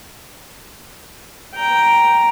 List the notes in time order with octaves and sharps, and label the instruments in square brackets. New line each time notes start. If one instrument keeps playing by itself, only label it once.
[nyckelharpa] G5 A#5